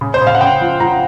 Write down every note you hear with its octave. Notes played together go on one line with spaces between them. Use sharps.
C#3
C5
C#3
F5
F#5
C#3 G5
F3
F3 A#5